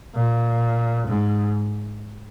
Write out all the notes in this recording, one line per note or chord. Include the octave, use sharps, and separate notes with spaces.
A#2
G#2